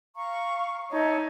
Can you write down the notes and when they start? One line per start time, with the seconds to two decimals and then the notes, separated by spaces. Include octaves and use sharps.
0.16 F5 A#5 C#6
0.92 D#4 C#5 E5 A5